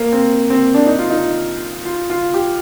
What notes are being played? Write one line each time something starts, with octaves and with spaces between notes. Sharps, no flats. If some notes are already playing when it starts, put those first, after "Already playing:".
Already playing: A#3
C4
C4
D4
D#4
F4
D#4
F4
F4
G4